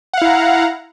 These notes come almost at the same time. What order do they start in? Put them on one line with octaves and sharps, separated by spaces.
F#5 F5 E4 A#5